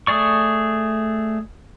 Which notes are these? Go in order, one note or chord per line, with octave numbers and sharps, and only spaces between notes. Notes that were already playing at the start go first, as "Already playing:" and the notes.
A3 G#4 D5 C#6